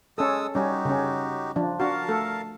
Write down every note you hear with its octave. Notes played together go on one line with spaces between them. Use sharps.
G#3 C#4 A4 D#6 E6
G3 C#4 D#4 F#4 G4
C#3 C#4
F3 D4
D4 F#4 A#4 F5 A5
A3 A4